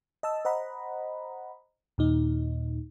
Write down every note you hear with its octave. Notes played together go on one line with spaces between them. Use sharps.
D#5 A5 E6
C5 D#5 F#5 A#5 B5
D#2 A#2 D#4